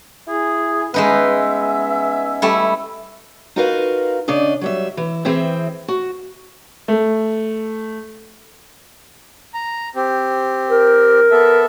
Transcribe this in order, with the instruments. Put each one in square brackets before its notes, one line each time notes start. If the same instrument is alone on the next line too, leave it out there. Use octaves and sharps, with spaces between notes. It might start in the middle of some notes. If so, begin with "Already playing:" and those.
[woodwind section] E4 G#4
[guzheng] G#3 D#4 B4 [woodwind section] B3 C#4 E5
[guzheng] G3 A3 E4
[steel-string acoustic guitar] D#4 F4 F#4 A#4 B4 F5
C#3 D4 D5 D#5
F#3 G3 E5
E3 E4
E3 C4 G#4 C5 E5 G5
F#4
[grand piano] A3
[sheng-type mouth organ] A#5
C4 G4
[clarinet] A#4
[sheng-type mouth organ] B3 A4 E5